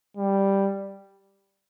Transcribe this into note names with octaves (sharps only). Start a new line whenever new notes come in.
G3